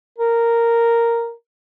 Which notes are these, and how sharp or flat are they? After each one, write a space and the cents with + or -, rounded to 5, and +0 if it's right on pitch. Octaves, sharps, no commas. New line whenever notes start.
A#4 -5